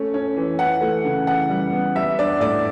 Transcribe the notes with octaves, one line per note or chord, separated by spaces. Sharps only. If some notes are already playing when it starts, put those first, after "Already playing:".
Already playing: A3 C#4
C#4
E3
E3 F#5
A3
C#3
E3 F#5
G3
B3
G3 E5
D4 D5
A2 D5